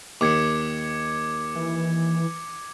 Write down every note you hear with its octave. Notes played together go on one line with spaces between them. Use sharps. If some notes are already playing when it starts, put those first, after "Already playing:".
D#2 D6 G#6 C#7
E3